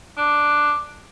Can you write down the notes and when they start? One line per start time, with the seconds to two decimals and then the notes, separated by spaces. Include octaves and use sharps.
0.18 D4